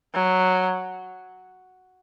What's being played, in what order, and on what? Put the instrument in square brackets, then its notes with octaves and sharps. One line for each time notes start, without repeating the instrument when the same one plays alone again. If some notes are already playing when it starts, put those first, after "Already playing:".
[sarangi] F#3